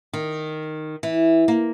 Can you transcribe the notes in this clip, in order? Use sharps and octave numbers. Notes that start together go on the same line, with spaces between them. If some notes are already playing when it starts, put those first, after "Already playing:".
D#3
E3
A#3